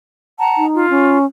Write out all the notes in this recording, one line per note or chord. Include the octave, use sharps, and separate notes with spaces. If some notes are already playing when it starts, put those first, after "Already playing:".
F#5 A5 A#5
D#4
F4
C#4